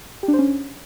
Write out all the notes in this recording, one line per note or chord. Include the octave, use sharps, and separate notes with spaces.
G4
D4
C5
C#4